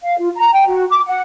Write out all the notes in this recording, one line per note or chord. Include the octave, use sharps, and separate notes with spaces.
F5
F4
A#5
G5
F#4
D6
F#5